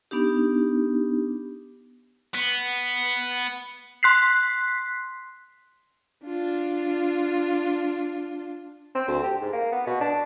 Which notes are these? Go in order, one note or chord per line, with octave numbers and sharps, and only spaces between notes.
B3 D4 D#4 G4
B3
C6 F#6 B6 C7
D4 F4
C4
D2
G4
G#2
A#3
B3
B2
D4